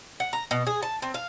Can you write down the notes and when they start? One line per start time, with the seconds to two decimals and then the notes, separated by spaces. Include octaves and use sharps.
0.20 F#5
0.33 A#5
0.51 B2
0.67 G#4
0.83 A5
1.02 C4
1.14 F5